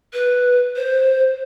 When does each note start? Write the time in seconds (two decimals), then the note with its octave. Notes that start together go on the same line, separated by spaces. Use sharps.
0.14 B4
0.76 C5